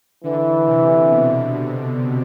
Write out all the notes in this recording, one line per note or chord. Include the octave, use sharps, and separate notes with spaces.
D3 E3
C3
B2